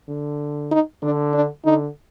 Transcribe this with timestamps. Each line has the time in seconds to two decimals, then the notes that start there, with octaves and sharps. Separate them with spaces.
0.08 D3
0.71 D#4
1.03 D3 D4
1.34 D4
1.65 D3 D#4